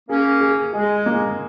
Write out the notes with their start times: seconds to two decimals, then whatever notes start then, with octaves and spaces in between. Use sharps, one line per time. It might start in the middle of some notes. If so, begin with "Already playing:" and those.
0.09 A#3 C#4 G#4
0.41 G#4
0.73 G#3 G#4
1.06 A#3